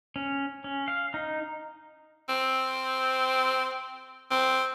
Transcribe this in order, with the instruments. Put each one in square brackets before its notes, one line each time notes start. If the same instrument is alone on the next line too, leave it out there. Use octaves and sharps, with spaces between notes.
[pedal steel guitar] C#4
C#4
F5
D#4
[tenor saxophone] C4
C4